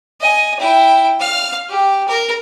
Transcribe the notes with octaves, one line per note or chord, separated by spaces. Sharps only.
D#5 G#5
E4 G5
F5 F6
G4
A#4